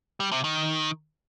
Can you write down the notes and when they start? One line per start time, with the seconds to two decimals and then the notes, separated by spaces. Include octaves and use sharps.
0.20 G3
0.32 C3
0.44 D#3